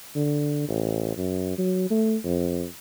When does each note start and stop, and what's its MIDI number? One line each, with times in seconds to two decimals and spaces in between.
0.16 0.65 50
0.69 1.14 33
1.17 1.57 42
1.58 1.88 54
1.90 2.17 57
2.25 2.66 41